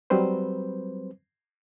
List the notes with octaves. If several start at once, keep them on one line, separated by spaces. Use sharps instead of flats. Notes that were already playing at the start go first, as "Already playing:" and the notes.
F#3 G3 C4 B4 C5